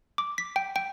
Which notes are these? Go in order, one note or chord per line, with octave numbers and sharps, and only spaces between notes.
D6
B6
G5
G5